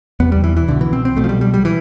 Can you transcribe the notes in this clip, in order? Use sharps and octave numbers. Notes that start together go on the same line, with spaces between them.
E2 C3 B3
G3
E3
E3
C2 B2 D3
E3
C4
C4
C2 B2 A3
F3
G3
G3
G3
E3